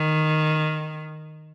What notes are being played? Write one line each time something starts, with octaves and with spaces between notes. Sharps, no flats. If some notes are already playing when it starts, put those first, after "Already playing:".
Already playing: D#3